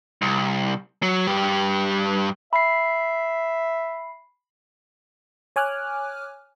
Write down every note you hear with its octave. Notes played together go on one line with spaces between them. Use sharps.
C2
F#3
G2 G4
E5 B5 C7
C#5 G#5 D6 F6 F#6